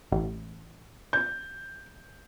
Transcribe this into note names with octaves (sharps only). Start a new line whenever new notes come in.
A1
G6